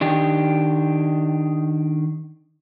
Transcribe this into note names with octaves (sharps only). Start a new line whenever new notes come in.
D#3 D4 G4